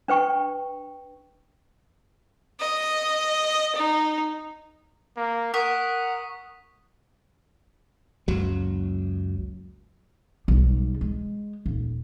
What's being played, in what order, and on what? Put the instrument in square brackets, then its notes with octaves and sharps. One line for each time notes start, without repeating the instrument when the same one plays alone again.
[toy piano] D4 B4 G5 C#6
[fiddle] D#5
D#4
[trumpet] A#3
[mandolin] A#4 [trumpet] F#5 [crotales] C#6 D#6 B6
[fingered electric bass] F#1 C#2 F#3
[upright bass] B1 G3
G#3
D#1